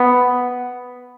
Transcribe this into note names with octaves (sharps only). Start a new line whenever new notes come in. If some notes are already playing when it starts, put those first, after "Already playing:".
Already playing: B3